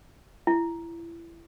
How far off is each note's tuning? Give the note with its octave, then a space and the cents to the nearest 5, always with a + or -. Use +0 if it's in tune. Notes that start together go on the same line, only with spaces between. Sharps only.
E4 +25